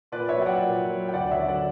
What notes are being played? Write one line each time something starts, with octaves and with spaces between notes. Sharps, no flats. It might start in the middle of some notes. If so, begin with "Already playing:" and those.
A#2 B4 D5
C#5 E5
F#3 G5
D5 F#5
A#2
F#3
G5
D2 D5 F#5
C#5 E5
D3 F#3
D5 F#5